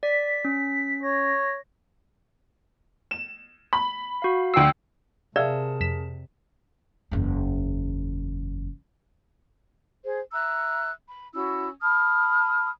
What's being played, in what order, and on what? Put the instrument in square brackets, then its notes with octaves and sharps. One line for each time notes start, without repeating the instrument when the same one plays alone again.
[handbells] D5 [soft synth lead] B6
[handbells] C#4
[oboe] C#5 [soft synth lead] A#6
[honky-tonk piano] E7
B5
[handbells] F#4 F5
[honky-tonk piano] D2 C7 [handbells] G5 E6
[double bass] C3 [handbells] G#4 A#4 A5 [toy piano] D5 [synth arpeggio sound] E5 F5 E6
[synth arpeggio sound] F2 B6 E7
[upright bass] F#1 E2
[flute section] G#4 C5
E5 A#5 E6 F#6
B5
C#4 E4 F#4 E6
A5 B5 D#6 F6